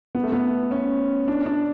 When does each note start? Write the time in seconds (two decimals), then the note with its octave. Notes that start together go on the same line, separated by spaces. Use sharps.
0.15 B3
0.23 A3
0.32 B3
0.71 C#4
1.28 D4
1.46 D4